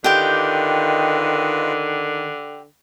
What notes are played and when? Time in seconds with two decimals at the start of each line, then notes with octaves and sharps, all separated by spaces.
0.04 D3 D#3 F4 G4 B4 D#5 G5